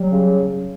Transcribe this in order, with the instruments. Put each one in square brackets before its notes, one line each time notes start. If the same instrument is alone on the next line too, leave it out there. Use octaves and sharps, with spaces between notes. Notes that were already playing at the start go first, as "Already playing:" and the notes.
Already playing: [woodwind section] F#3 [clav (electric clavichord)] G3
[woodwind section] C#3